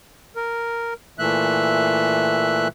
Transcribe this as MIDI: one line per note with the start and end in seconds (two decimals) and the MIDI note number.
0.36 0.94 70
1.19 2.68 46
1.19 2.68 52
1.19 2.68 57
1.19 2.68 76
1.19 2.68 90